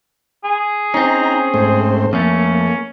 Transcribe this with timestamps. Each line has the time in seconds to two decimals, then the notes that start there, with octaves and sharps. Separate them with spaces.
0.44 G#4
0.94 C4 C#4 D#4 A#5
1.54 G#2 A3 C5
2.13 F2 A3 A#3 C#4